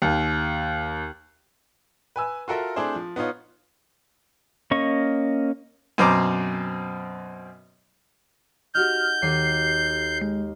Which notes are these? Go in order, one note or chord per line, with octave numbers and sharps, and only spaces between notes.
D#2
B4 G#5 E6
F4 F#4 A4 A#4 E5
A3 C4 D4 E4 G#4 C5
F3
B3 D#4 F4 C#5
A#3 C#4 D#5 C#6
F#2 B2 C4 C5 A#5 D6
D#4 F#4 G4 F6 G6
D#2 A4 C7
G#3